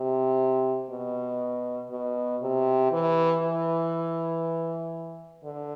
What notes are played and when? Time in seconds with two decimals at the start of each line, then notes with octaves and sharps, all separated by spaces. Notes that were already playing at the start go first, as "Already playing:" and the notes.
Already playing: C3
0.90 B2
1.91 B2
2.41 C3
2.92 E3
3.42 E3
5.44 D3